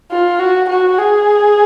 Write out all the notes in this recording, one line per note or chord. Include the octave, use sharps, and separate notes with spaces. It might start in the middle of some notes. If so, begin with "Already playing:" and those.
F4
F#4
F#4
G#4